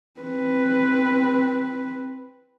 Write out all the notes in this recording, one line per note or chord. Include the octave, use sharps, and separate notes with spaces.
C4 B4